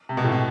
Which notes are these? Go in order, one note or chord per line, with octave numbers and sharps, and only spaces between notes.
C3
B2
A2
B2